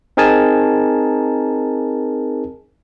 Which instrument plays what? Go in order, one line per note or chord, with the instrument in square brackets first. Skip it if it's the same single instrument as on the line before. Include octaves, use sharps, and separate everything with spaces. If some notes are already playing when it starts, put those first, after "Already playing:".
[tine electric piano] C4 D#4 G#4 A#4 G#5 A5